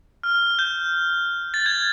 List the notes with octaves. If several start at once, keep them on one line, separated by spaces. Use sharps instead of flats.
F6
G6
A6
G#6